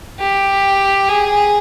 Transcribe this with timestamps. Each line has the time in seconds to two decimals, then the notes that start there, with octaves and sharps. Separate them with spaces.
0.20 G4
1.09 G#4